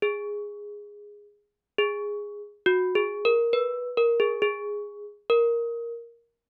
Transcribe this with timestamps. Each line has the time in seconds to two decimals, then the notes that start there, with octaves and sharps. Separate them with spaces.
0.02 G#4
1.78 G#4
2.66 F#4
2.95 G#4
3.25 A#4
3.53 B4
3.97 A#4
4.20 G#4
4.42 G#4
5.30 A#4